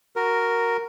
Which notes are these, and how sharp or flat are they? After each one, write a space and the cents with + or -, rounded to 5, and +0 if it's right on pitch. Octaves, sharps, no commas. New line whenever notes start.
F#4 +0 A#4 +0